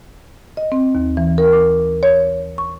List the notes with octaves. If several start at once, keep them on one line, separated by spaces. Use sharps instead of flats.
D#5
C4
D#2
E3
A#4
D6
C#5
C#6